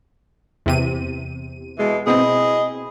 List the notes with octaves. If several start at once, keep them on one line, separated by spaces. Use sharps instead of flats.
E2 C3 D#7
B2 E3 G#3
B2 C4 E4 G#4 D#5